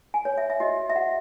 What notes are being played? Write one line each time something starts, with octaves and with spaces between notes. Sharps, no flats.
G#5
C#5
E5
E5
F#4 D#5
E5
F#4 F#5